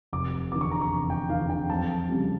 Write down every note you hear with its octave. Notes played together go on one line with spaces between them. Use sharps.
F1 D6
E2 D3 D6
C#6
A#5
C#6
F1
G5
E2 D3 F5
G5
F2 A5
C#3 G3